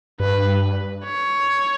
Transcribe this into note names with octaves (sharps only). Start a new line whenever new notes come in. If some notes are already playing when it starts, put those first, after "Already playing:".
G2 B4
C#5